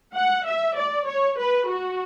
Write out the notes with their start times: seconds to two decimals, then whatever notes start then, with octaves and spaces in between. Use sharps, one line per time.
0.13 F#5
0.45 E5
0.75 D5
1.06 C#5
1.38 B4
1.68 F#4